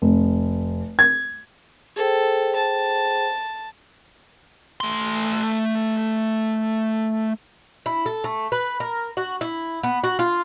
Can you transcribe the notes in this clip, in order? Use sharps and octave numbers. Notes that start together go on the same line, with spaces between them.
F1
G#6
G#4 A4 C5 G5
A5
A3 C6
E4
A4
A3
B4
A#4
F#4
E4
B3
F#4
F4